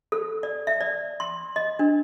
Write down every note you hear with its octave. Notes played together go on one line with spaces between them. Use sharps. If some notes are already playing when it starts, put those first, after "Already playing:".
A4
D5
E5
D5
C6
D#5
D4